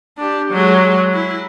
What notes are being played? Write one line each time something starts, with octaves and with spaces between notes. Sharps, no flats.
D4 G4
F#3 G#3
E4